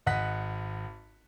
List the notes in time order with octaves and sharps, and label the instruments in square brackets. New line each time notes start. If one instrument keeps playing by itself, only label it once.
[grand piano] G#1 D#5 F#5 F#6 B6